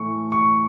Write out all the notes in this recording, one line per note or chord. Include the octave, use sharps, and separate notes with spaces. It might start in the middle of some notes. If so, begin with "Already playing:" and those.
Already playing: A2 E3 A3 C#6
C#6